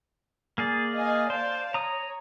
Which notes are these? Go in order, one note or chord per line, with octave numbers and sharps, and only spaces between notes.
A#3 G#4 D5
D#5 F5 G#5
C5 D5 F5 A5
C#5 A#5 D#6